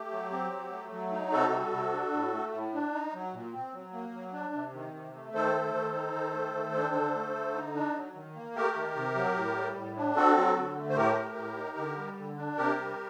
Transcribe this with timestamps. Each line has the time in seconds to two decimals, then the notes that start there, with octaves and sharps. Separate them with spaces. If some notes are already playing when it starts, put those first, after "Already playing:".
Already playing: A3 G4
0.12 F#3
0.32 C4
0.52 F#3
0.72 A3
0.92 F#3
1.12 D#4
1.32 C3 F#4 A4
1.52 G3
1.73 C3
1.93 D4
2.13 A2
2.33 A3
2.53 A2
2.74 D4
2.93 D#4
3.14 F#3
3.34 A#2
3.53 C4
3.74 F#3
3.93 A#3
4.14 F#3
4.33 D4
4.54 C3
4.74 D#3
4.94 C3
5.15 A3
5.34 D#3 A4 C5
5.54 A3
5.74 D#3
5.94 D#4
6.14 D#3
6.34 A3
6.55 D#3
6.74 D4
6.95 D3
7.15 A3
7.35 D3
7.56 D#4
7.75 D4
7.96 F#3
8.15 D#3
8.36 A#3
8.55 A3 G4 A#4
8.76 D#3
8.96 C3
9.16 F#3
9.36 A2
9.56 G3
9.76 A2
9.97 D4
10.16 C4 F#4 A4
10.37 F#3
10.57 D3
10.77 A3
10.89 C5
10.96 A2 G4 A#4
11.17 A3
11.37 A2
11.57 D#4
11.77 D3
11.98 G3
12.18 D3
12.37 D4
12.57 C3 G4 A#4
12.77 G3